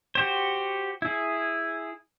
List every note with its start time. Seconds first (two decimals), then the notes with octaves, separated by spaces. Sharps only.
0.15 F#4 G4 C5
1.02 E4 G#4